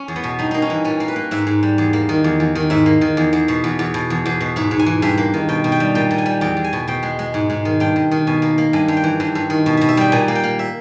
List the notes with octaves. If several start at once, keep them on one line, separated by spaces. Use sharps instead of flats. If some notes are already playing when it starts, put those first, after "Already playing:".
Already playing: C#4
E2
B3
B2
G2 D#4
A#3 D#4
C#4
E3
A#2 C#4
A#3
B4
A#3
G#2 E5
G#2
G3
E2
A#3
D#3
E2
E2
D#3
G#2 E5
A#3
D#3
E2
E2
B2
E2
E2
B2
E2
E2
B2
G#2 E5
G#2
G#5
E3
G2 E5
A#3
D#3
B2 G5
B2
G5
G3
A#2 G5
A#2
G#5
G3
E2 G5
E2
G#5
B2
B2 G5
G#3
G#3
G#2
G#2
D#3
G2 G5
G2
D#3
B2 G#5
A#3
A#3
G2 G#5
G2
G5
E3
G2
G2
D#3
B2
B2 E5
E5
G3 G5
A#2 G#5
A#3
G5
A#3
E5